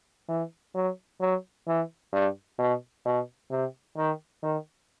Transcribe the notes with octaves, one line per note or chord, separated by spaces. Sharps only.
E3
F#3
F#3
E3
G2
B2
B2
C3
D#3
D#3